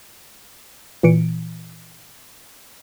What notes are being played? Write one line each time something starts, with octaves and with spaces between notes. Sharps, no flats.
A#2 E3 C#7 D7